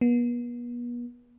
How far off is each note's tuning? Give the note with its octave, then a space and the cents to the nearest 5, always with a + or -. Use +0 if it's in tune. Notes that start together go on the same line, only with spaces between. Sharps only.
B3 -40